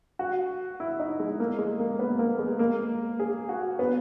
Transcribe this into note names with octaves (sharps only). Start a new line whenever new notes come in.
F#4
E4
D#4
G#3
A#3
G#3
A#3
B3
A#3
G#3
A#3
G#4
F#4
B3